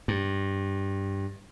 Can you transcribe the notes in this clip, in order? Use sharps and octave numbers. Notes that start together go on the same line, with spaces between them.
G2